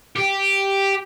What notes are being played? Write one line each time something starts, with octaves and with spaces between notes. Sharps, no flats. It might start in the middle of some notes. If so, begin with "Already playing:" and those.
G4